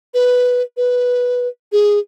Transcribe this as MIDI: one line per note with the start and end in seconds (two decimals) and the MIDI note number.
0.14 0.62 71
0.77 1.48 71
1.72 1.99 68